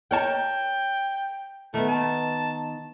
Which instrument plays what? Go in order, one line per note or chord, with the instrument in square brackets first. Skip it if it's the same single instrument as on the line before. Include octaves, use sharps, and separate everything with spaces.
[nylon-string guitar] A#4 C#5 A5 [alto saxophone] G5
[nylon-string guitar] D#3 B3 [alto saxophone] A3
[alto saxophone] A5